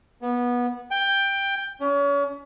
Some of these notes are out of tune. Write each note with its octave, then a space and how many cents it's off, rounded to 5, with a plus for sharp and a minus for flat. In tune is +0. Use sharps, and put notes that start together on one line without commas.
B3 -20
G5 +10
C#4 +35